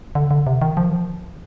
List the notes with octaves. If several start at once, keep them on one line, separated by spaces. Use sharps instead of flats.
D3
D3
C3
D#3
F3
D#3
F3